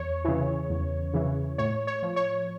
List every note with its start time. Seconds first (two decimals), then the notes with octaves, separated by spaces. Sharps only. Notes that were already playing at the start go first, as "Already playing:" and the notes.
Already playing: E2 C#5
0.25 C#3 E3
0.70 E2
1.13 C#3 E3
1.58 A2 C#5
1.87 C#5
2.02 F3
2.16 C#5